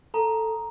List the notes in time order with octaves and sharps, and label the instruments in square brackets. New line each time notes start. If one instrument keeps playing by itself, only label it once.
[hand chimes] A4 [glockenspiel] A#5